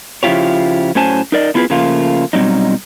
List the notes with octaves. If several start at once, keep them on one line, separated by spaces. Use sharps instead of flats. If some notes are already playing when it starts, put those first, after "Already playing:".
C#3 F3 E4 F4 G4 C#5
A2 F#3 C#4 C5 G#5 A5
D#4 A#4 D5 D#5
A3 B3 E4 F4 G#4 B4
C#3 F3 A3 A#3 F4
B2 F#3 G3 C4 C#4 D#4